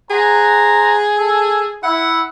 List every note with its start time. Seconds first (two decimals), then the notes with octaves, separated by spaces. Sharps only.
0.10 G#4 C5 F#5 A#5
1.18 A4
1.83 E4 F#5